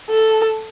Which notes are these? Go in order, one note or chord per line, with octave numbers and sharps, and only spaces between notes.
A4